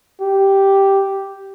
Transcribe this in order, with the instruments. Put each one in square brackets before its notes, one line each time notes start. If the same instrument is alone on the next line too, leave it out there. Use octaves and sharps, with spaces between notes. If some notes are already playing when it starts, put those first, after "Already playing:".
[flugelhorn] G4